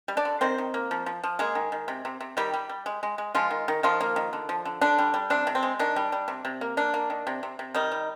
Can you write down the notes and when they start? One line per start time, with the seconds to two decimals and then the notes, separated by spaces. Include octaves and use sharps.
0.08 G3
0.17 D4 D5
0.25 D3
0.41 D#3 C4 C5
0.58 D#3
0.74 A#3
0.91 F3
1.06 F3
1.24 F3
1.39 G#3 A#3 G#4
1.55 D#3
1.72 D#3
1.88 C3
2.05 C3
2.21 C3
2.37 D#3 G3 G4
2.54 G3
2.69 G3
2.86 G#3
3.03 G#3
3.18 G#3
3.35 F3 G#3 F4
3.51 D#3
3.68 D#3
3.83 D#3 F3 F4
4.01 A#3
4.16 D#3
4.33 D3
4.49 F3
4.65 D3
4.81 D3 D4
4.98 G3
5.14 G3
5.30 C3 D4
5.47 C3
5.55 C4
5.63 G#3
5.79 D#3 D4
5.96 G3
6.12 G3
6.28 C3
6.45 C3
6.61 A#3
6.77 A#3 D4
6.94 A#3
7.10 D#3
7.27 C3
7.43 C3
7.59 C3
7.75 D#3 G3 D#4
7.92 G3